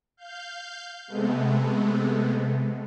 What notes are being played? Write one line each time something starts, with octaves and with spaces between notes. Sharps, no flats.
F5 G6
C3 G#3 A3 B3